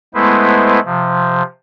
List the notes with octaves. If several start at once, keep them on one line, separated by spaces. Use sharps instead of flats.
G#3 A3 B3 E4 B4 C5
C3 F3